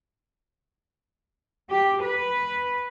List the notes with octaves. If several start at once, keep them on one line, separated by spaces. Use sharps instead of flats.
G4
B4